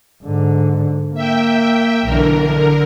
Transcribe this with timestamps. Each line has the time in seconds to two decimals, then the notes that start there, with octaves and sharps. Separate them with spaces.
0.23 G#2 D3
1.15 A#3 E5 G5
2.04 B1 D3 E3 A#4